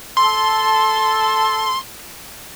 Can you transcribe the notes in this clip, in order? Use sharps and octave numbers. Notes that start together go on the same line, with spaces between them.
A4 C6